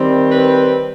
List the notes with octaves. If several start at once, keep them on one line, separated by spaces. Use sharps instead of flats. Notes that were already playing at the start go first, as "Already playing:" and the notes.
Already playing: D#3 G3 C4
B4